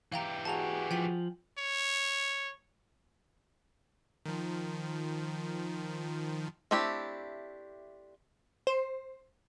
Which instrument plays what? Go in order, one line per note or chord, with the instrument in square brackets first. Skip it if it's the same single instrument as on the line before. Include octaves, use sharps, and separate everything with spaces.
[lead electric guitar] E3 G4 [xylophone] F5 G5 A#5
[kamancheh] F#4 G#4 [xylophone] A5 A#5 F7
[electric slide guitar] F3 [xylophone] G5 G#5 B6
[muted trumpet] C#5
[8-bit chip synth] D#3 F3
[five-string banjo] A3 C4 D4 E4 G4
[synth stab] C5